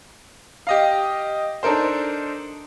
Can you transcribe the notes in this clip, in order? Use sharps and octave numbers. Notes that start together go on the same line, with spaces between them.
G4 D#5 F5
D4 D#4 A4 A#4 C5